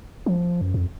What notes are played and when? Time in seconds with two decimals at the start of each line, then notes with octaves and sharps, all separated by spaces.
0.26 F3
0.61 F#2
0.74 F2